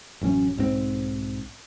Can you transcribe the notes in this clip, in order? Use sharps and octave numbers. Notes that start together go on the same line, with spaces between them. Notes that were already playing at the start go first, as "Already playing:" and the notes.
A1 F#2 F#3 C#4
B1 G#2 D#3 C4